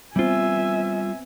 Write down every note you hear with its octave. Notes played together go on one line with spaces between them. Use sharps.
G3 B3 C4 F4 E5 G#5